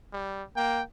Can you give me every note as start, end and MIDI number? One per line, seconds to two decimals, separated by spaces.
0.13 0.43 55
0.56 0.83 58
0.56 0.82 79